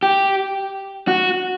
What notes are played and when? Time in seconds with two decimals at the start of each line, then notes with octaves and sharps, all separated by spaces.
0.03 G4
1.08 F#4